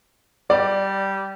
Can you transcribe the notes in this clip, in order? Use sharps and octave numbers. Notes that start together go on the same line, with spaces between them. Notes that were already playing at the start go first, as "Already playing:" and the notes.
G3 D5